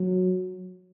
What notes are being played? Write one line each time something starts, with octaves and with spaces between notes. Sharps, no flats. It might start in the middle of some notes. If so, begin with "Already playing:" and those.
Already playing: F#3